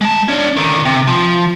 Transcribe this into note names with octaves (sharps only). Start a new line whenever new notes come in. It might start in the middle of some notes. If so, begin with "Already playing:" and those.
G#3 A5
C#4 D4
D3 D#3
C3
F3